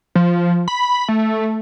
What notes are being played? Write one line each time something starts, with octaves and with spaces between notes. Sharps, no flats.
F3
B5
A3